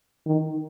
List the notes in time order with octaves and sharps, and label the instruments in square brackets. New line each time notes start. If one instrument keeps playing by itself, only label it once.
[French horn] D#3